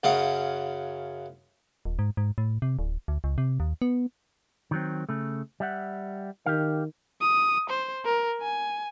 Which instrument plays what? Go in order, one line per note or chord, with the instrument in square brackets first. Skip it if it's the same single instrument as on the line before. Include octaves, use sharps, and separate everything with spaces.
[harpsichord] F#2 C#3 F5 F#5
[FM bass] D#1
G#2
G#2
A2
C3
D1
D2
C#2
C3
D#2
B3
[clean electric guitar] D#3 F#3 C4
C#3 A3
G3 E5 F#5
[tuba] D#3 [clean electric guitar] G4 F5
[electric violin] D#6
C5
A#4
G#5